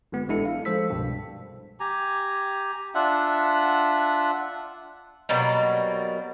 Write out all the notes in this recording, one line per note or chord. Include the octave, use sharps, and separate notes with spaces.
G1 G#3 B3
A1 G#3 D4 E4 A4 C#7
F5
F3 G#3 A4 C5 E6 B6
C2 G2 B2
G4 G#5 A#5
D4 F4 E5 F#5
B2 F#3 G3 A#3